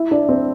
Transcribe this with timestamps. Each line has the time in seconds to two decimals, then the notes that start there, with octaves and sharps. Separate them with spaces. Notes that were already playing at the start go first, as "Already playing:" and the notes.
Already playing: E4 E5
0.11 D4 D5
0.29 C4 C5